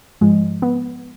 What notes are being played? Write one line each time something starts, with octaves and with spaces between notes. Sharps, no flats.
G#2 F3 G#3
B3